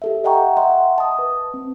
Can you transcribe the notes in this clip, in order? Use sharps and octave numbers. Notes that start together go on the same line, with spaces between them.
G4 A4 E5
D#5 E5 F#5 G5 A#5 C#6
D#5 E5 F#5 C6
A5 D#6
B4
C4